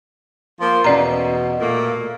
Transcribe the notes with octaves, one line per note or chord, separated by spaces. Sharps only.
F3 A#3 C5
E2 B2 C#4 D5 A#5
A#2 A3 A#3